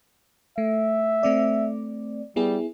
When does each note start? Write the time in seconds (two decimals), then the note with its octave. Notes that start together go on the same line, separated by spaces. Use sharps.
0.58 A3 E5
1.23 A3 C4 D5
2.36 G3 B3 E4 G#4